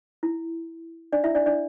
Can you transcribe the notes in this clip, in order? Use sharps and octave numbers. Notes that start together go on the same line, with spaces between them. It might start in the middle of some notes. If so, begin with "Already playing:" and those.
E4
D4 D5
E4 E5
D4 D5
D4 D5